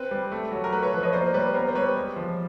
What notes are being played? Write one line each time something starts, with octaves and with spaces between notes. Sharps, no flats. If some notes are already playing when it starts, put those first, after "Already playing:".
Already playing: C4 B4
G3
A3
F#3
A#4
A3 B4
B4 C#5
F3 B4
C#5 D#5
A#3 C5 D5
G3 B4 C#5
B3 A#4 C5
C5
G3 B4 C#5
G#3
F3